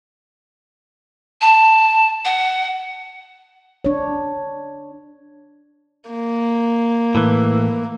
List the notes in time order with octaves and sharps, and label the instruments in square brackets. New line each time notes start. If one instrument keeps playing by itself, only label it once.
[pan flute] A5
F#5
[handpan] D4 C#5
[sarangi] A#3
[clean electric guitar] A2 E3